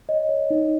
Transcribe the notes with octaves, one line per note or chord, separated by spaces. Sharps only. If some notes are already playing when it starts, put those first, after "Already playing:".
C#5 D#5
C#5
D#4